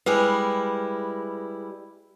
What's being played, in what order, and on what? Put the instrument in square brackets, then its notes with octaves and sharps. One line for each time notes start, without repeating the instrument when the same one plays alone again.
[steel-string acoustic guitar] G3 G#3 E4 [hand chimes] B4